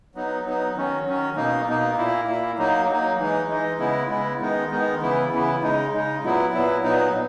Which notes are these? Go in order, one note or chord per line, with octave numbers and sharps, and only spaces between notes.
F#3 B3 D#4
F#3 B3 D#4
D#3 F#3 C#4
D#3 F#3 C#4
B2 A#3 D#4
B2 A#3 D#4
A#2 A#3 E4
A#2 A#3 E4
F#3 A#3 D#4
F#3 A#3 D#4
E3 G#3 D#4
E3 G#3 D#4
C#3 G#3 B3 E4
C#3 G#3 B3 E4
D#3 G#3 B3 D#4
D#3 G#3 B3 D#4
C#3 E3 B3 E4
C#3 E3 B3 E4
C#3 G#3 D#4
C#3 G#3 D#4
A#2 F#3 B3 E4
A#2 F#3 B3 E4
A#2 F#3 B3 D#4